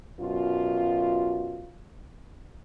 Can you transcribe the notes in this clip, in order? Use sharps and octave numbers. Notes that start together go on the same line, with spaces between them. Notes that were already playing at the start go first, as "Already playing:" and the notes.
F#2 B2 F4